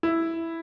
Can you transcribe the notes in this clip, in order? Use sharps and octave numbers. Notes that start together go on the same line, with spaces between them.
E4